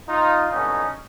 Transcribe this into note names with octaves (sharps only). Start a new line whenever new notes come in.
D#4 F4
C2 B2 F#3 A3 C#4 D#4